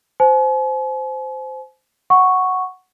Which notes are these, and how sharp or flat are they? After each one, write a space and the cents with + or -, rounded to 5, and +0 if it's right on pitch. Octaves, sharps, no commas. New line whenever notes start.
C5 -10 G#5 +45
F#5 +0 C#6 +0